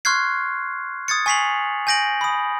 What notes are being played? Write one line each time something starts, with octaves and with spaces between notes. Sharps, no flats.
C6 C#6 F6 F#6 G#6 C7
D#6 G#6 A6 C#7
G#5 C#6 B6 C7 F7 F#7
G#5 G6 A#6 D7 F#7
B5 D#6